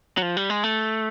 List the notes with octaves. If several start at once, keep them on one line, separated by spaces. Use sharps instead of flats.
F#3
F3
G3
G#3
A3